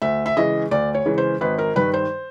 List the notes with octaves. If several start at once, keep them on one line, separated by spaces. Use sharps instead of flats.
D2 E5
E5
C#3 E3 G#3 D#5
D2 D5
C#5
C#3 E3 G#3
C5
G#1 B4
A#4
G2 D#3 B4
C5